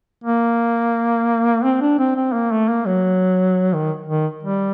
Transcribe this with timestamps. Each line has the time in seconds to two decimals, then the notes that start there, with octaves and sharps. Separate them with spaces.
0.24 A#3
1.64 C4
1.81 D4
1.99 C4
2.16 C4
2.33 A#3
2.51 A3
2.69 A#3
2.86 F#3
3.73 D#3
4.09 D#3
4.43 G3